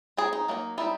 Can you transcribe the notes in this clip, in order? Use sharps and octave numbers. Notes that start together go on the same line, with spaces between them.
G#3 C4 D#4 G#4
D#4
F#3 A#3 D#4
G3 C4 D#4 E4